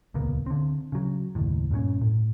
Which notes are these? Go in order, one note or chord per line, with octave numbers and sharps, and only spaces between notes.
D#1 C#2 A#3 B3
D3 C4
C#3 F#3
F#1 D#2 A2
G2 A#2 C4 C#4
A2